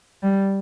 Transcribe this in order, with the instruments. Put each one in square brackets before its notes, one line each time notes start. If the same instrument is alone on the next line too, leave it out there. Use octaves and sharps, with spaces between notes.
[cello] G3